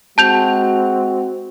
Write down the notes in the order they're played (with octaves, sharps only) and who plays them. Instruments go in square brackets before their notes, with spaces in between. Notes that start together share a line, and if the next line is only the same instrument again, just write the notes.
[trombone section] G#3 C4 F#4 [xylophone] A5 G6 F7